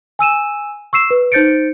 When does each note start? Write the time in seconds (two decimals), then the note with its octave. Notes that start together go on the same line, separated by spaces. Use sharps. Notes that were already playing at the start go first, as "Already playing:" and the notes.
0.19 G#5 E6 D#7 E7
0.93 C#6 E6 C7 E7
1.11 B4
1.32 D#4 C5 G6 A6 C#7 D7